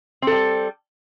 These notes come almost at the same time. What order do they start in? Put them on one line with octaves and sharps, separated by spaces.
C4 A4 G3